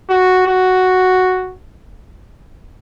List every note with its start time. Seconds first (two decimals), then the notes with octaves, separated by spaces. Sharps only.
0.09 F#4
0.47 F#4